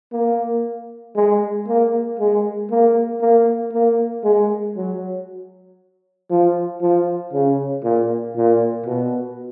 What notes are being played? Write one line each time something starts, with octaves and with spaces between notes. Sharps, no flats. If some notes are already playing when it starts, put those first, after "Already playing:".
A#3
G#3
A#3
G#3
A#3
A#3
A#3
G#3
F#3
F3
F3
C#3
A#2
A#2
B2